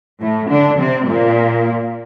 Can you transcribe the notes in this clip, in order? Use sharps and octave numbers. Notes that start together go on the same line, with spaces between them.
A2 A3
D3 D4
C3 C4
A#2 A#3